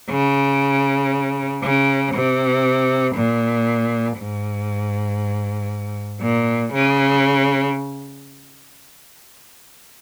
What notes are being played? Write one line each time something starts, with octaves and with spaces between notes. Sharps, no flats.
C#3
C#3
C3
A#2
G#2
A#2
C#3